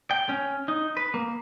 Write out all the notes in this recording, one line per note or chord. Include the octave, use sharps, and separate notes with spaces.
G5
C#4
D#4
B4
A#3